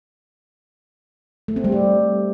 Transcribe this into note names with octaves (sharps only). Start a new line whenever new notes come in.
A3
C4
G3
G4